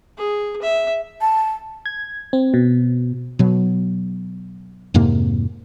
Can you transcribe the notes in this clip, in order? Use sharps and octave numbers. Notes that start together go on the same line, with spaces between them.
G#4
E5
A5
G#6
C4
B2
B2 F#3
F2 G#2 C3 A#3